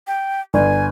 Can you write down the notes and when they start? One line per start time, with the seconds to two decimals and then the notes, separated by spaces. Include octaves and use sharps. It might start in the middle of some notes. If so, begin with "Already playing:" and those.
0.07 G5
0.54 G1 G#5